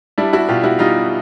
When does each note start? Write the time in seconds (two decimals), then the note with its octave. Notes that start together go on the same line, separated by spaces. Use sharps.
0.18 G3 D4 E4
0.33 E4 F#4
0.49 B2 F4 G4
0.64 E4 F#4
0.79 G3 D#4 F4